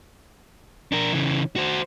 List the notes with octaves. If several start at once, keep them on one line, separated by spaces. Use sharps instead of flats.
D4 A#4
C#3 E3
F#4 C5